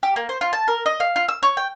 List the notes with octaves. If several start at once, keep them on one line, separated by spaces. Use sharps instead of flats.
G4
A#3
C5
F4
A5
A#4
D#5
F5
F4
E6
C#5
G5